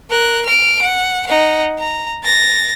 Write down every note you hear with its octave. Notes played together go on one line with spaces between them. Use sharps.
A#4 F#6
F6 D7
F#5
D#4 F#5
A#5
A6 A#6